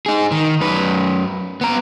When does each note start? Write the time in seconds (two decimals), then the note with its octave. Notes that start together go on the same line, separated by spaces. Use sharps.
0.06 D#4 G#4
0.31 D#3
0.60 F#2 B4
1.61 B3 A#5